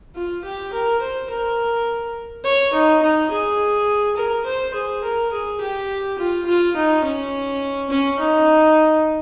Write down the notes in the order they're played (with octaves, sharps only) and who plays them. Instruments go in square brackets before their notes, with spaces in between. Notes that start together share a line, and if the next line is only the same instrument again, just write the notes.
[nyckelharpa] F4
G4
A#4
C5
A#4
C#5
D#4
D#4
G#4
A#4
C5
G#4
A#4
G#4
G4
F4
F4
D#4
C#4
C#4
D#4